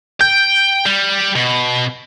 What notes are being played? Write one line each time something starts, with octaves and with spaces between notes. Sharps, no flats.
G5 G6
G3
B2